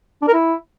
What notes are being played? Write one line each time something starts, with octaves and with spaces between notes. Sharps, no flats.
D4
A#4
E4